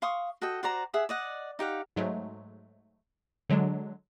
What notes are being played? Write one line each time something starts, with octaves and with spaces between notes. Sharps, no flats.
F5 C6 C#6 D#6
F#4 A4 D#5 G5
F#4 C5 D5 A#5
G#4 E5 F#5 D#6
D5 D#5 F#5
D#4 G4 F5 F#5
G#2 F#3 G#3 A3
D3 F#3 G#3 D4